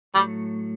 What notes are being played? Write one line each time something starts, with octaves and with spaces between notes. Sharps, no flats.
A2 F#3 G3 A3